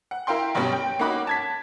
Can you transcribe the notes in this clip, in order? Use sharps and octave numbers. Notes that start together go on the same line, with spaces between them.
F#5
E4 A#4 F5 G5 C6
G2 B2 F#3 G3 C#4
G5
A#3 C#4 D#4 F#4 B5 D6
A5 G#6 B6